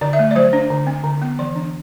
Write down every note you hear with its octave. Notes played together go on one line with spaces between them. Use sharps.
D3 D5
E5
A3
D5
F#3 C5
D4
D3
C4
D3
B3
E3 D5
D4